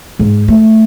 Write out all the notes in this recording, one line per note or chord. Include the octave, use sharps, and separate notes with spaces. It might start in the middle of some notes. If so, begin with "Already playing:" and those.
G#2
A3